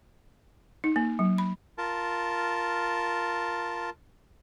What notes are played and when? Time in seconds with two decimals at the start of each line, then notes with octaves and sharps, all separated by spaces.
0.84 D#4
0.96 A#3
1.19 F#3
1.38 B5
1.78 F4 A#4 A5